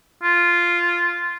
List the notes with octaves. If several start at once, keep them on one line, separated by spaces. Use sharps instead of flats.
F4